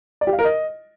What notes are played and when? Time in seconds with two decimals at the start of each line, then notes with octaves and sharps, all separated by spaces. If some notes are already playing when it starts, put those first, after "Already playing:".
0.21 D5
0.27 G4
0.33 F5
0.39 A#4
0.44 D#5